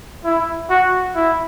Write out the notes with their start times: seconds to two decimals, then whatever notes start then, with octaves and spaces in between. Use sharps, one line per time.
0.24 E4
0.70 F#4
1.15 E4